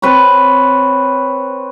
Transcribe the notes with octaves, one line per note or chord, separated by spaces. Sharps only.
C4 B4 C#5 C#6